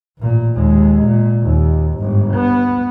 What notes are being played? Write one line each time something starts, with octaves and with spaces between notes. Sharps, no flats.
A1 A#2
D#2 G#3
A#2
D#2
G1 G#2
B3